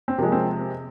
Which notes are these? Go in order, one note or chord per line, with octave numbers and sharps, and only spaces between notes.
C4
C3 F3 G#3 A#3
C4